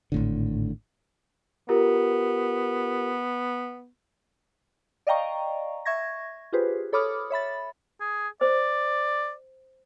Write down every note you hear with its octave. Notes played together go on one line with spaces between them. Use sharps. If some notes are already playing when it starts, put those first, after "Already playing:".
G#1 A2 D3
B3 F4 G4 A#4
D5 D#5 F5 G5 A#5 C#6
E5 C#6 G#6 A#6
F4 G4 G#4 B4 C5
A4 C#5 B5 D6 D#6 F6
C#5 E5 B5 A6
G#4
C5 D5